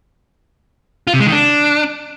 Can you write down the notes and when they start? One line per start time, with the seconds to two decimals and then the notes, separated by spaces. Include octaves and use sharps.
1.07 F4
1.14 C3
1.20 G#3
1.26 D#3
1.32 D4